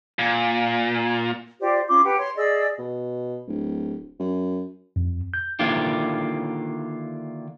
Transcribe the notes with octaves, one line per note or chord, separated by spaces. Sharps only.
A#2
F4 G4 C5 D5
C#4 F4 C6 D6
G4 B4 F#5
C#5 C6
G#4 D5 D#5 E6
B2
D1
F#2
F2
G6
D3 D#3 A#3 E4 F4 G4